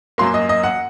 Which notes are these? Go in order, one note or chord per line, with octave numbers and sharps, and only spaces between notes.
F#2 F#3 A#3 C6
D#5
D#5
F#5